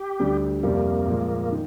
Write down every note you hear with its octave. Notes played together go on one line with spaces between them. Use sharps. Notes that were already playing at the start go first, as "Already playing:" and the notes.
Already playing: G4
D2 D3 G3
F2 C3 G3 A#3
A#2 F3 G#3
D#3